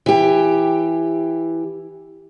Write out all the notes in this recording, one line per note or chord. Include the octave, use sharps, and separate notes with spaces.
E3 G4